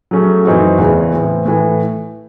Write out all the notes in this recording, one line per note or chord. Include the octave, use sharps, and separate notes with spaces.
F#3 A3 C#4 G#4
F#2 E3 C4 D#4 F#4
E2 C#3 E3 G#3
A2 E3 C4
A2 E3 A3